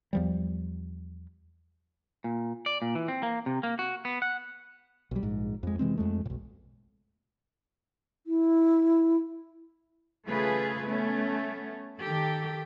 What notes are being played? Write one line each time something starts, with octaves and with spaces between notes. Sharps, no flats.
E2 F3 G3
A#2
D5
A#2
E3
C4
A#3
C3
A#3
F#4
B3
F#5
B1 G3
A#1 G#2
F2 G#3
C3 E3 G#3 C4
F2 G#3 A3
B1 A2
E4
C#3 A3 F4 G#4 B4
A3 B3 C#4
D#3 G4 A4